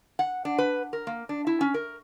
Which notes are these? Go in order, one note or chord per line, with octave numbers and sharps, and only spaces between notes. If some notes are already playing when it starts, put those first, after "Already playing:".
F#5
D4
B4
A#4
A#3
D4
E4
C#4
A#4